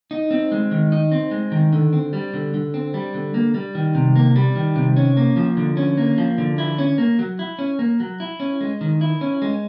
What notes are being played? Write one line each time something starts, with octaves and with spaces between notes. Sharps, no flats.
D#4
C4
G#3
D#3
D#4
C4
G#3
D#3
D3
C4
G3
D3
D3
C4
G3
D3
A#3
G3
D#3
C3
A#3
G3
D#3
C3
C#4
A#3
F3
D3
C#4
A#3
F3
D3
E4
C#4
A#3
F#3
E4
C#4
A#3
F#3
E4
C#4
G#3
D#3
E4
C#4
G#3